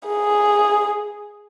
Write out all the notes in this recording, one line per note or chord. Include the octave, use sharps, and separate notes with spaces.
G#4